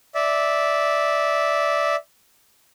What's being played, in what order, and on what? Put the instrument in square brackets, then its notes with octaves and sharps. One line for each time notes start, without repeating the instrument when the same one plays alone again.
[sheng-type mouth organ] D5 E5